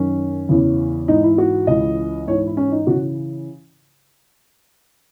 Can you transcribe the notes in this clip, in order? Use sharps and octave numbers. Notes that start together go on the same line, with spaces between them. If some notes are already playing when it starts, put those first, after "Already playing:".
Already playing: F#2 D#3 C#4
E2 C#3 E3
G#2 E3 D#4
E4
F#4
C#2 C#3 E3 D#5
G#2 E3 C#5
E4
C#4
D#4
C#3 E3 F#4